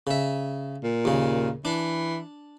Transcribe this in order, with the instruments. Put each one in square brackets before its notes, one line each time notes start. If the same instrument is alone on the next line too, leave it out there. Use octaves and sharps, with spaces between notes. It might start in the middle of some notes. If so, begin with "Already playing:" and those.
[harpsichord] C#3 E5
[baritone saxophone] A#2
[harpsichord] D#2 C#3
[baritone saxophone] E3 [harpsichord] D4